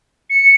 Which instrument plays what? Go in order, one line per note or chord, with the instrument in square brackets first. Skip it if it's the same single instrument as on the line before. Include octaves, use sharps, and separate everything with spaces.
[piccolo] C#7